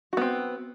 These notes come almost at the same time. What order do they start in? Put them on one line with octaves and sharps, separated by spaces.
F#4 B3 C4